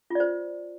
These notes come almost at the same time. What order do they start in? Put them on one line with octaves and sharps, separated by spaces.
F4 D5 C5